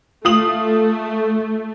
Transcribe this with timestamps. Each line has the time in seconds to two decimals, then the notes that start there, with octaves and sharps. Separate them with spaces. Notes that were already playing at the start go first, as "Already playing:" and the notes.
0.25 A3 F4 D#6 F#7